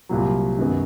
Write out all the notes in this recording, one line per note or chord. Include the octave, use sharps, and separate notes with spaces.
C2 A#2 F#3
F#2 D#3 G#3 B3